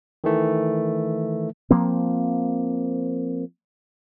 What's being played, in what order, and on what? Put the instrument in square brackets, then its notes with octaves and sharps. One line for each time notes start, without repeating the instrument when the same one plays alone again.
[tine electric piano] D#3 E3 A3
[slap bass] F3 A#3 C4